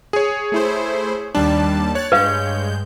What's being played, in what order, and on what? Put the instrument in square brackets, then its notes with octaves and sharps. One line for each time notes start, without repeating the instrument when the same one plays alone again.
[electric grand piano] G#4 C#5
[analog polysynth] A3 E4 C5
[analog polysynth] D#2 G3 A5 [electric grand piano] D4
[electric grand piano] C#5 [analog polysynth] F#6 A6
[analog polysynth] G2 G#3 G6 [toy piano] B4 F5